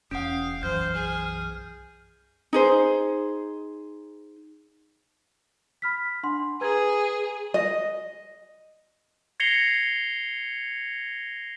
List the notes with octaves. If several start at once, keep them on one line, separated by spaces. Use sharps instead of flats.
E1 C#4 F5 F#5 D#6
B1 F#2 E3 C5 F6 G6
G#4
D#4 G#4 C5
B5 F6 B6
D4 F#5 C6
G#4 B4 A#5 G#6
D#5
G#6 A#6 C7 C#7 F7 G7